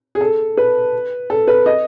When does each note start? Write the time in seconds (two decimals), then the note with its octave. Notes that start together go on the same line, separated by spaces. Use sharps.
0.15 G#4
0.21 A4
0.57 B4
1.30 A4
1.48 B4
1.66 D#5